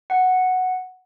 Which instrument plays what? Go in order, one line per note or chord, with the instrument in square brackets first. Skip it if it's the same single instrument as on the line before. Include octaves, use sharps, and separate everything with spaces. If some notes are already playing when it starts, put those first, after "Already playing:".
[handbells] F#5